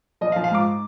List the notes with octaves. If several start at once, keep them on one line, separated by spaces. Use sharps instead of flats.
F3 D#5
F5
F3
F5
G#2 D6